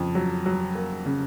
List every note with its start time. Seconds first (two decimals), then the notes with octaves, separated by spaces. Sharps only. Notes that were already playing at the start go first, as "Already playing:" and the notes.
Already playing: F2 C#3
0.15 F#3
0.46 F#3
0.75 A#3
1.06 C#3